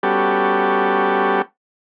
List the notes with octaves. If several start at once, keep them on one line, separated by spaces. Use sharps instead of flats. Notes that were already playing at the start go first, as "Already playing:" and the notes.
G3 B3 C#4 F#4 G4 A4